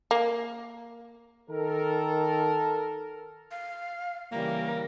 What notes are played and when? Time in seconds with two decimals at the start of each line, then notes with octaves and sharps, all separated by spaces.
0.11 A#3
1.50 D#3 A4 A#4
3.51 F5
4.32 C#3 E3 G3 A#3 A#4